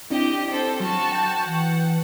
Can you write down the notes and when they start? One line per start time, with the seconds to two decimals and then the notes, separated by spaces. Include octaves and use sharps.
0.10 C4 D4 E4 G4 D#5
0.51 A4 C5
0.80 F#3 F#4 A5
1.12 G5 G6
1.45 E3 F#5